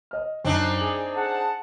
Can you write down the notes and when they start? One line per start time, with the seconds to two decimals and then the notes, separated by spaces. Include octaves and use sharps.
0.11 D#5 F6
0.45 F#2 C4 D4 D#4
0.78 G#4 F#7
1.14 G#4 F#5 A5